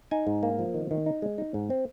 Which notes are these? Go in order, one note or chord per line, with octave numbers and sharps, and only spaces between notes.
D#4 G#5
G#2
A#3
F3
D#3
D#3
D#4
G#3
D#4
G#2
C4